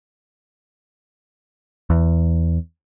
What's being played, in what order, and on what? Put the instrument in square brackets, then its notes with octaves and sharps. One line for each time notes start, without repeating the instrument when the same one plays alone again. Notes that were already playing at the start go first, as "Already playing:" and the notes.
[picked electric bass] E2